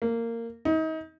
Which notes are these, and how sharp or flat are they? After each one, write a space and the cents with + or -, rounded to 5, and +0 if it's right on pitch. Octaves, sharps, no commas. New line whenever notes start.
A#3 -15
D#4 +35